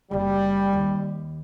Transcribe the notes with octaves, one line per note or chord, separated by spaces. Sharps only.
F#1 C2 G3
D#2